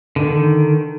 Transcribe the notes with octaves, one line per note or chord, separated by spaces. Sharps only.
D3 D#3